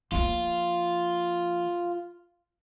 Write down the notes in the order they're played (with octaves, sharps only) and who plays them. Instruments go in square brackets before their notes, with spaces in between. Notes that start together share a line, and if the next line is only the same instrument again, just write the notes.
[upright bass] F3 A#3 [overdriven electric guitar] F4